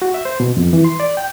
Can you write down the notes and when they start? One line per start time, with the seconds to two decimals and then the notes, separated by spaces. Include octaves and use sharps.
0.02 F#4
0.14 E5
0.25 C5
0.40 B2
0.57 F2
0.73 E3
0.84 C6
1.00 D5
1.17 G5